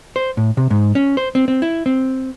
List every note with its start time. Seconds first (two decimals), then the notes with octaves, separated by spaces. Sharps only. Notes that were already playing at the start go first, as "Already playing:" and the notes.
0.16 C5
0.37 A2
0.57 C3
0.70 G#2
0.95 C#4
1.17 C5
1.35 C4
1.48 C4
1.62 E4
1.86 C4